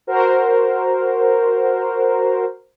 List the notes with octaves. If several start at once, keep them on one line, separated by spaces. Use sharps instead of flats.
F#4 A#4 C5